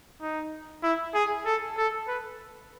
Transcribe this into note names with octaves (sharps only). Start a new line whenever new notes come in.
D#4
E4
G#4
A4
A4
B4